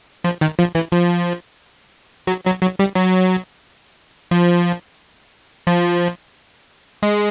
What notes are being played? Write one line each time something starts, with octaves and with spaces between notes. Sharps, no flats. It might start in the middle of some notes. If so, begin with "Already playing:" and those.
F3
D#3
F3
E3
F3
F#3
F#3
F#3
G3
F#3
F3
F3
G#3